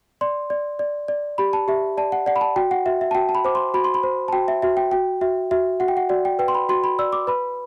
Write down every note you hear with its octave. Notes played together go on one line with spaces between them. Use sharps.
D5 C6
D5
D5
D5
G4 B5
A5
G4 E5
D5 A5
F#5
D5 F#5
B5
A5
F#4 G5
F#5
F#4 E5
E5
A5
F#4 G5
A5
B5
C5 D6
C6
F#4 B5
C6
B5
C5
A5
F#4 G5
E5
F#4 E5
G5
F#4 G5
F#4 E5
F#4 E5
F#4 F#5
G5
F#5
F#4 D5
G5
B4 G5
C6
B5
F#4 C6
B5
D5 E6
D6
B4 B5